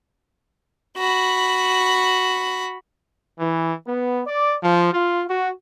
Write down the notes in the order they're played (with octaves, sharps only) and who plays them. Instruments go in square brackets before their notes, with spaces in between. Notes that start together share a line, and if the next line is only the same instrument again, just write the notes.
[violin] F#4 B5
[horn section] E3
B3
D5
F3
F4
F#4